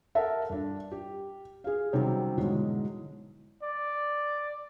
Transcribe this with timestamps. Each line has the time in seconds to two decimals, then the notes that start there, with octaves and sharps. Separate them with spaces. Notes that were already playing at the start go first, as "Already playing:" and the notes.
0.15 A4 A#4 E5 F#5 A5
0.50 G2 D4
0.92 G4
1.64 G#4 F5
1.93 C3 D#3 F#3 G3 C4 C#4
2.37 G#2 B2 D3 E3 F#3 G#3
3.63 D5